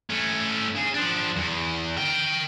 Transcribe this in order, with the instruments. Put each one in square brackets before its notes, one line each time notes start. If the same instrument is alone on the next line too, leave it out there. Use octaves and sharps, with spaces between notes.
[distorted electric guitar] A3 C#4
C#3 G#4
F3 D4
E2
A#4 G5